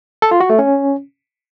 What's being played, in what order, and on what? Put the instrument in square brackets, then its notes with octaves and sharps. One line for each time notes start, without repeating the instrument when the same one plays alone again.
[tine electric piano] A4
F4
F#4
A3
C#4